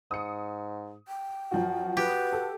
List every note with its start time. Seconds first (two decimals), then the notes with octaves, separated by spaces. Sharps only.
0.11 G#2 D#6 C#7
1.08 G5
1.52 F#2 F3 F4 F#4
1.97 G4 B4
2.33 A4